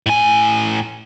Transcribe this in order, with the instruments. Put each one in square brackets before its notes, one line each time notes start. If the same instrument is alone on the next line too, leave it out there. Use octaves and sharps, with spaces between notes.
[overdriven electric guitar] A2 G#5